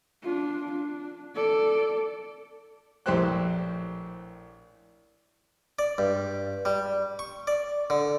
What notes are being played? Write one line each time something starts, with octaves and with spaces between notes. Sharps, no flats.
D4 F4
D4
A4 D5
A#1 A2 G4 C5 G5 F#6
D5
G2
G3
C#6
D5
D3